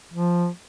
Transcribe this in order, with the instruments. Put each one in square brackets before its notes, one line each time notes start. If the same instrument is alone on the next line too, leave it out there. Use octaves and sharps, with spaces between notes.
[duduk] F3